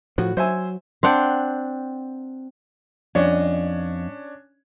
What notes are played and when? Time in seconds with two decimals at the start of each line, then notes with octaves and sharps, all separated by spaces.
0.18 A2 F3 F#4
0.37 F#3 C5 E5 G#5
1.03 C4 D4 F#5 G5
3.15 F2 C#4 D4 C#5 D#5